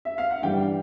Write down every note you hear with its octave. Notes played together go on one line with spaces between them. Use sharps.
E5
F5
F#5
G2 E3 G3 G5